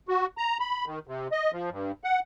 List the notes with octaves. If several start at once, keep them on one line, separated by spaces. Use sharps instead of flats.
F#4
A#5
B5
D#3
C3
D#5
F3
G2
F#5